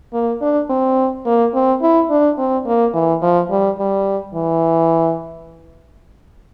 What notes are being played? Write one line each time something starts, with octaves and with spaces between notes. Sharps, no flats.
A#3
D4
C4
A#3
C4
E4
D4
C4
A#3
E3
F3
G3
G3
E3